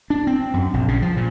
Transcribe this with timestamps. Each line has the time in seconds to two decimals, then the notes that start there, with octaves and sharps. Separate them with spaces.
0.10 D4
0.27 C4
0.54 F#2
0.74 A#1
0.88 C#3
1.02 F3
1.17 A#2